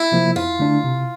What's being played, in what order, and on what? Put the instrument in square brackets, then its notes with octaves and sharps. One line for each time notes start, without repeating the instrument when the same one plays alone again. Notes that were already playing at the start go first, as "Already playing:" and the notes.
Already playing: [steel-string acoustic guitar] E4
[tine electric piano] C3 F3 A#3
[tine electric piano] F2 [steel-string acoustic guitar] F4
[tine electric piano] D3 A3 D4
C3